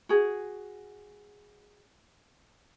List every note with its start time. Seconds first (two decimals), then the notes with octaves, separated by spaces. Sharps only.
0.09 F#4 G#4